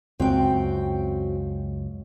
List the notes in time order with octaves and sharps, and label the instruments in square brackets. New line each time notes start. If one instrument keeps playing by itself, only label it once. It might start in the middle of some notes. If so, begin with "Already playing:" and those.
[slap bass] C#2 F#2 [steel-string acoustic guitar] C4 F#4 G5